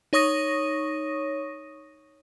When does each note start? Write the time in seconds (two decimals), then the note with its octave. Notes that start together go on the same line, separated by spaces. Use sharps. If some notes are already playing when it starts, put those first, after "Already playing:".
0.13 D#4 C#5 C#6 D#6 A#6 D#7